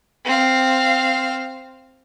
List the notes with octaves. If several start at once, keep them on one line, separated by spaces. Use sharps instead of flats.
C4 F5